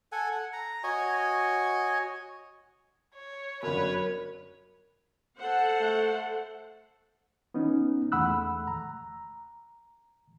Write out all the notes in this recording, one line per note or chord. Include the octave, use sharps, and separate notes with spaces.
A4 F#5 G#5
F#5
A#5
F#4 C#5 D#5 G#5
C#5
G1 F#2 A#4 B4 C#5
A4 C5 F#5
A3
B3 C#4 D#4
E2 A3 F#5 B5 E6 F#6
A#5